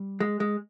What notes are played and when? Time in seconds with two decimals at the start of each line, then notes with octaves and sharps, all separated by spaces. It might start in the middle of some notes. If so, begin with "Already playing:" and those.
Already playing: G3
0.20 G#3
0.40 G#3